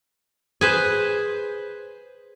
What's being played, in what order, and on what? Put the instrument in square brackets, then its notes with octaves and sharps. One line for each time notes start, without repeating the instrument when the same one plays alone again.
[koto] G#4 B4 C5